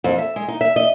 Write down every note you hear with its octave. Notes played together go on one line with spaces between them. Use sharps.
F2
E5
G#3
D#4
E5
D#5